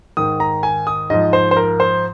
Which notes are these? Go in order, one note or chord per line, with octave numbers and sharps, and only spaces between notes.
G#2 D#3 D#6
A#5
G#5
D#6
G#2 F3 D#5
C5
C5
A#4
C5